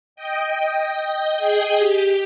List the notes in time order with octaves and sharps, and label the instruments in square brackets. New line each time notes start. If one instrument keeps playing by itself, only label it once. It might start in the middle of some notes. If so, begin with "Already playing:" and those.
[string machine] D#5 G5
D#5 G5
G#4
G4